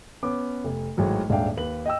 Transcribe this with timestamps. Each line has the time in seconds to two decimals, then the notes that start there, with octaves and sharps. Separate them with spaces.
0.23 B3 C#4 D6
0.64 F1
0.97 G#1 A2 F#3 G#3
1.29 D#1 G#2 D4 E5 F5 G5
1.57 D#2 B4 F#7
1.86 D#5 G5 E6